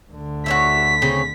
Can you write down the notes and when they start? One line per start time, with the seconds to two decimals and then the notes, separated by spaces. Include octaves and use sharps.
0.11 D2 D3
0.46 F#4 C#5 E5 B6
1.02 C#3 C4 C#4